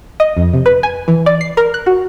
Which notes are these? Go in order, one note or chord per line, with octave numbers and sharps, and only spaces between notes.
D#5
F2
C3
B4
G#5
E3
D5
C7
A#4
F#6
F#4